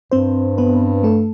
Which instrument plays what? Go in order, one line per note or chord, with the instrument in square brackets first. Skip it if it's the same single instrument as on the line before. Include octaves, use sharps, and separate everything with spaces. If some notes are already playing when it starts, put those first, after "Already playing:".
[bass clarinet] G2 [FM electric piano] C4 C5
[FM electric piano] B3 B4
A3 A4